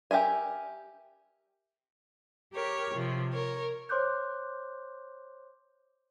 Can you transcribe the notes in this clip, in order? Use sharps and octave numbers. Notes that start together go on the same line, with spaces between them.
G4 A#4 E5 G#5
G4 A#4 C#5
C3 F3
A#4 C#5
C5 C#5 C6 D6 F#6 G6